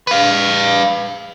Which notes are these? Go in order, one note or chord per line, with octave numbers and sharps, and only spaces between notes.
B4 F5